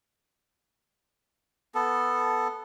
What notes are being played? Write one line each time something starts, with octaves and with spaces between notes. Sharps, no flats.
B3 A4